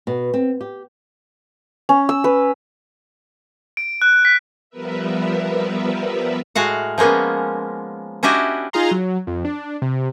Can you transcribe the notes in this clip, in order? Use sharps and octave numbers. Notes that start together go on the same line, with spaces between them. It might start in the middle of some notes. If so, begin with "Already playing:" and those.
B2
C4
G4
C#4
E6
B4
D7
F#6
B6
F3 G3 B3 A#4 B4 E5
A2 G#3 F#4 F5 F#5
F3 G#3 A#3 B3 C#4
C#4 D4 E4 F#4 G4 D#5
D#4 F4 G#4 F5 A#5 C6
F#3
F2
D4
C3